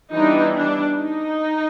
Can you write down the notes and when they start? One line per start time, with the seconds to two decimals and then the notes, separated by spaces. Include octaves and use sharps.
0.13 E3 G3 B3 D4 D#4
0.55 D4
0.98 D#4